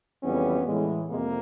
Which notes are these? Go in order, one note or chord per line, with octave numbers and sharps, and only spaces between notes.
F2 C#3 E3 G3 B3 C#4
A2 E3 G#3
F2 C3 G#3 A#3